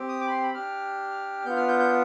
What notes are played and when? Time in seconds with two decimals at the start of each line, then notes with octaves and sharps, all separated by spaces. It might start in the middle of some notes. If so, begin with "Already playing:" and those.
Already playing: C4 G4
0.08 D#6
0.20 D6
0.27 B5
0.31 C6
0.43 B5
0.54 D4 G4 F6
1.45 B3 D4 F4 G6
1.56 F6
1.68 G6
1.79 G6